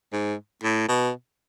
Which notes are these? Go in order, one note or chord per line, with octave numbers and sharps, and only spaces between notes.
G#2
A2
B2